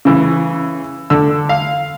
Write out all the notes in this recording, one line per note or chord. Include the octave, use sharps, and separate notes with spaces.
C#3 E3
D3 E6
F5